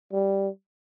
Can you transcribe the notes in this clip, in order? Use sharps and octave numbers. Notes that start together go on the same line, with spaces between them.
G3